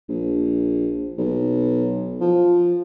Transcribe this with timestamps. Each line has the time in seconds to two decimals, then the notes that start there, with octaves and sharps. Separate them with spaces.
0.09 A#1
1.18 B1
2.21 F3